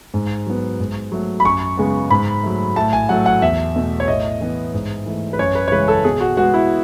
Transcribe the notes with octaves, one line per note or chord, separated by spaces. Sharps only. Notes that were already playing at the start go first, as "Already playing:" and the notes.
G#2
F#3 B3
G#2
F#3 A3
B5
F#2 C#6
C#3 G#3 B3
G#2 B5
F#3 A3
A2 A5
G#5
F#3 A3 F#5
F#5
E2 E5
B2 A3
C#5
A2 D#5
E3 B3
G#2
E3 A3
B4
F#2 C#5
B4
C#5
C#3 E3 G#3 B4
A4
B2 G#4
F#4
G#3 B3 F#4
E4